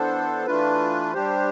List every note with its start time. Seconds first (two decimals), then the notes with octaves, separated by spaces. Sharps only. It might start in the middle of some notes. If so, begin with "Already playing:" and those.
Already playing: E3 B3 D4 A4 C5
0.46 E3 A3 D4 F4 B4
1.14 G3 D4 G4 C5